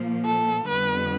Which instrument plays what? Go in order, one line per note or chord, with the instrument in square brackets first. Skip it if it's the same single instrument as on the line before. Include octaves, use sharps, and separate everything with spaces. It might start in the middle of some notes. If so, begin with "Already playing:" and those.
Already playing: [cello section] A#2 F3 A#3
[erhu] A4
[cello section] F2 D3 G3 B3 [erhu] B4